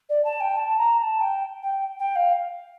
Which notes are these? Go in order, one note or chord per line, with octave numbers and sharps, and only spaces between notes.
D5
A5
G5
A5
A#5
A#5
A5
G5
G5
G5
F5